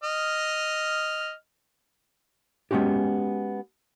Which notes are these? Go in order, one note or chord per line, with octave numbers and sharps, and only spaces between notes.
D#5 F6
G#3 B3 C#4 F#4 G4